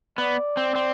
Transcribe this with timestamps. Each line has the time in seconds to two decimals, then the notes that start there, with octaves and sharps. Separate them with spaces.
0.18 B3 D5
0.57 C4
0.75 C4